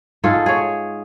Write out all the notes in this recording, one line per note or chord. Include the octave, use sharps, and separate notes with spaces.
G#2 F4 G#4 A4
G#4 C#5